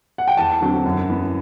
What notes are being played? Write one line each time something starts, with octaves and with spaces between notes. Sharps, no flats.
F#5
G5
E2 A5
D3 F#3 C4
F#2
E3 B3